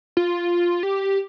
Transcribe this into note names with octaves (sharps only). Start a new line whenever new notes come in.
F4
G4